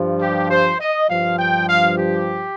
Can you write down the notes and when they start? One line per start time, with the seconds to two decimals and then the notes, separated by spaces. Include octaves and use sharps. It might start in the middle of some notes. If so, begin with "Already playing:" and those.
Already playing: G2 F3
0.20 G4
0.49 C5
0.79 D#5
1.08 G2 F3 F5
1.38 G5
1.68 F5
1.96 G4